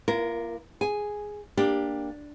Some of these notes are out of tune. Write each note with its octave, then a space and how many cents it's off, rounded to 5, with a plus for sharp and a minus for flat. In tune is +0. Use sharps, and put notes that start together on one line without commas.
A#3 +25 F4 -40 A#4 +0
G#4 +0 G#5 +0
A#3 +10 D4 +0 G4 +15